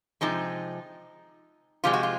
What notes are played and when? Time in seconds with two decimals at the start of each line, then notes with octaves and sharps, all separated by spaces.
0.21 C3 F3 G#3 D#4
1.84 C3 F3 G#3 F4
1.93 F#4
2.03 F4